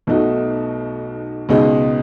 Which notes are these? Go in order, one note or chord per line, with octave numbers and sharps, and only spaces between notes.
B1 B2 A3 D#4 F#4
C#2 B2 G#3 D#4